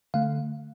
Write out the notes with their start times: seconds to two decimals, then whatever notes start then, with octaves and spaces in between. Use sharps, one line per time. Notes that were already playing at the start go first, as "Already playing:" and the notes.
0.14 D3 A3 F5